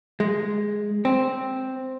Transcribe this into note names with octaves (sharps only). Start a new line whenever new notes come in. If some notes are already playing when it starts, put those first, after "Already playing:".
G#3
C4